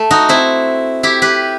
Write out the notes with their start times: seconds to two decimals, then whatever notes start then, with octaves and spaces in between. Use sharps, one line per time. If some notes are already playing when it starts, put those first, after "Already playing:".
Already playing: A3
0.11 D#4 F#4
0.29 C4 E4
1.03 E4 G4
1.22 G4 B4